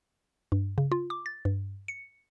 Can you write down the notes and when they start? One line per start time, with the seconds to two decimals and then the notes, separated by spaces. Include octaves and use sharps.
0.52 G2
0.78 C#3
0.92 F4
1.10 D6
1.26 A6
1.45 G2
1.88 C#7